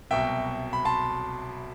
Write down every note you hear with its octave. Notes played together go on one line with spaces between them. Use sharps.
C2 B2 F#3 E5 G5
B5
A5 C6